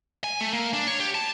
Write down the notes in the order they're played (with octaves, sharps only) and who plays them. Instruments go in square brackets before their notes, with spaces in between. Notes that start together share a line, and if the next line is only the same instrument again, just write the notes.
[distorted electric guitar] G#5
A3
A#3
D4
C#5
G4
A5